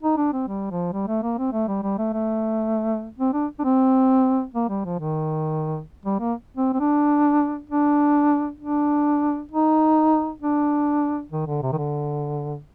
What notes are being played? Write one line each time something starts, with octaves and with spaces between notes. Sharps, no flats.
D#4
D4
C4
G3
F3
G3
A3
A#3
C4
A3
G3
G3
A3
A3
C4
D4
D4
C4
A#3
G3
F3
D#3
G3
A#3
C4
C4
D4
D4
D4
D#4
D4
D#3
D3
C3
D#3
D3